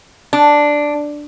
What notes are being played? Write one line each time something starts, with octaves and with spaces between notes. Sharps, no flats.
D4